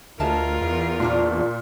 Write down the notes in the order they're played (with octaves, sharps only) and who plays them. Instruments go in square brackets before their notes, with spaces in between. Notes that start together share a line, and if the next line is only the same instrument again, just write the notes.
[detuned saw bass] D2 [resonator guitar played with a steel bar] G#3 E5 A5 [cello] F4 A#4
[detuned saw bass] E2
[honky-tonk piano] A#2 [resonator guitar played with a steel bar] C4 D4 F#4